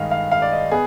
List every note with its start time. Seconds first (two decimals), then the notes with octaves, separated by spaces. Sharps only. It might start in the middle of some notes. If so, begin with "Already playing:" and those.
Already playing: G2 D#3 G#3 D#5 F5
0.11 F5
0.32 F5
0.42 D5
0.52 D#5
0.72 B3 G#4